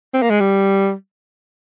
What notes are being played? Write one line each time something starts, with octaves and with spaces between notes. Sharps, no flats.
C4
A#3
G#3
G3